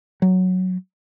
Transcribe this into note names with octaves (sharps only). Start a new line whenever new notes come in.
F#3